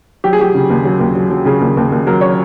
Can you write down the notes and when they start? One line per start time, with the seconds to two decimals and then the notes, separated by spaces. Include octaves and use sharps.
0.24 F#3 G4
0.33 G#4
0.39 F#3 G4
0.55 C#3
0.70 D#2
0.85 F#3
1.00 D#2
1.16 F#3
1.30 F#3
1.45 C#3 G#4
1.61 D#2
1.77 D#2
1.92 D#2
2.07 F#3 A#4
2.21 C#5